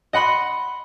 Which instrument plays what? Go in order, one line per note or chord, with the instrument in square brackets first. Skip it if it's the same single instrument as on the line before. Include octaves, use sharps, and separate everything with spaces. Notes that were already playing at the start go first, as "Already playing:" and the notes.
[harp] D#5 F#5 B5 C6